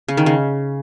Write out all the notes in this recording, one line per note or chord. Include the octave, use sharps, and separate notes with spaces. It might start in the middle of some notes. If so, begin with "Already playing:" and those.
C#3
D#3
C#3